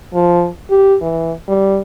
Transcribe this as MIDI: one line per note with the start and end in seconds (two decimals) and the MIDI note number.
0.14 0.48 53
0.70 0.96 67
1.01 1.33 52
1.48 1.81 55